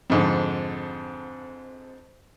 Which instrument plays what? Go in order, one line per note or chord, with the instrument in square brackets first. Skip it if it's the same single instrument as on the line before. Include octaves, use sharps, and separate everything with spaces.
[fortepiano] F2 G#2 D3